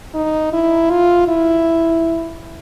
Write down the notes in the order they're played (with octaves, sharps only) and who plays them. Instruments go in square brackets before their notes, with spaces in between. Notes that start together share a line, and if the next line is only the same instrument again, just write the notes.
[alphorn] D#4
E4
F4
E4